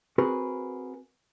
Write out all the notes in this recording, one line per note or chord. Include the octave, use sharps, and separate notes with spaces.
C4 F#4 G#4 A#4 B4